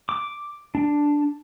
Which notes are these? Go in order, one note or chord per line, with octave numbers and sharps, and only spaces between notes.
D6
D4